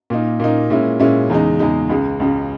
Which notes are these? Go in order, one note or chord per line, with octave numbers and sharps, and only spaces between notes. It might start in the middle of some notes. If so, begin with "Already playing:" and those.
A#2 A#3 D#4
A#2 A#3 D#4
A#2 G#3 C#4 E4
A#2 G#3 C#4 E4
E2 C#3 G#3 D#4
E2 C#3 G#3 D#4
C#2 C#3 G#3
C#2 C#3 G#3